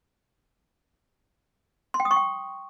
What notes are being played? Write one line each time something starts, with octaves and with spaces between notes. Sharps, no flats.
C6
G5
D#6
C#6
G5